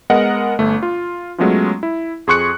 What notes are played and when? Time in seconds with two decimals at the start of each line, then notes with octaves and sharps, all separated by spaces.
0.10 G#3 B3 A#4 D#5 F#5
0.59 G1 A3
0.83 F4
1.38 F#3 G#3 A3 B3 C#4 F4
1.83 E4
2.27 F2 G#4 C6 C#6 F#6 C#7